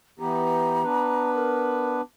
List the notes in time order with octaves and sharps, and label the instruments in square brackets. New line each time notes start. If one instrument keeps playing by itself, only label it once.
[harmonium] E3 B3 G4 [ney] A#5
[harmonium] B3 D4 B4
[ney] A#4